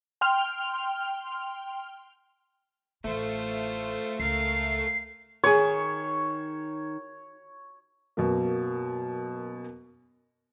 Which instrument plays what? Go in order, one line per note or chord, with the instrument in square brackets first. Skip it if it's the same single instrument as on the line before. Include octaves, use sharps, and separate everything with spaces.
[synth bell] G5 C6 F6 F7
[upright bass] A1 E3 [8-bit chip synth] A3 [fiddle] F4 C5
[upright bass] C#2 [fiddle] A#4 F5 [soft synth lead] C7
[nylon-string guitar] D#3 G#4 [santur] C#5
[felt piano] F#2 B2 F#3 A#3